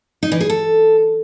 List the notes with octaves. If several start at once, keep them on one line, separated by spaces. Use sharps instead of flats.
D#4
E3
G#4
A4